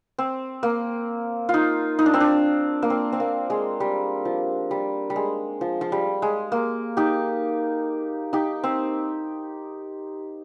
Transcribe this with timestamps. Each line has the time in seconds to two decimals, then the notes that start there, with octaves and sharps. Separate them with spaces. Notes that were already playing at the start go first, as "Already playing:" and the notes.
0.19 C4
0.63 A#3
1.49 F4
1.54 D#4
1.99 D#4
2.06 D4
2.14 C4
2.20 D4
2.82 A#3
2.90 C4
3.12 C4
3.20 A#3
3.50 G#3
3.80 G3
4.25 F3
4.71 G3
5.10 G3
5.16 G#3
5.61 F3
5.81 F3
5.92 G3
6.22 G#3
6.52 A#3
6.97 D#4 G4
8.33 D#4 G4
8.64 C4